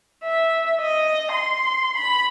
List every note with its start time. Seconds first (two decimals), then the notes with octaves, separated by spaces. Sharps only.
0.23 E5
0.80 D#5
1.33 C6
1.96 B5